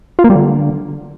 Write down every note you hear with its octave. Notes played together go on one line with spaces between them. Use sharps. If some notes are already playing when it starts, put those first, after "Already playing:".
F4
A#3
G3
D3